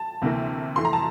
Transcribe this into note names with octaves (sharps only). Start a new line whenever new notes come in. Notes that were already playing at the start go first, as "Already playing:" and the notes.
Already playing: A5
D2 C3 E3 A#3
F2 E3 A3 C6
A#5
A5